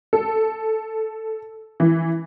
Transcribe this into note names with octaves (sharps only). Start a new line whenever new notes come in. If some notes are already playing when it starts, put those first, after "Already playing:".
A4
E3